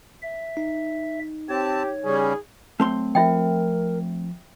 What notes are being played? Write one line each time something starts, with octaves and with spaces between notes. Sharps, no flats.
E5
D#4
C4 G4 C#5 A5
C#3 G3 C#4 G#4
F#3 A3 C4 C6
F3 F4 A#4 E5 G5